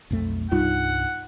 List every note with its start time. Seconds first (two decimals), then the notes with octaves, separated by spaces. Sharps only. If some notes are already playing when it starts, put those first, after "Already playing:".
0.11 B1 F2 A3
0.52 C2 G2 G3 D#4 F4 F#5